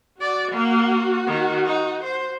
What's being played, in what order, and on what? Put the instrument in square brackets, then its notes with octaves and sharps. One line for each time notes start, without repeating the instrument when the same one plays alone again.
[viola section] F#4 [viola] D5
[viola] A#3
D#3
D#4
C5